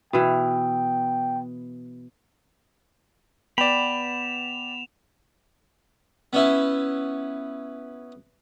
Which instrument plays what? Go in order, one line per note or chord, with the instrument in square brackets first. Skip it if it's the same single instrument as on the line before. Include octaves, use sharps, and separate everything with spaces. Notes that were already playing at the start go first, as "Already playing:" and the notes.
[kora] B2 E3 [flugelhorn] G5
[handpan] B3 [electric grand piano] D5 G5 [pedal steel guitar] B5 [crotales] E7 F7
[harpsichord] B3 C#4 E4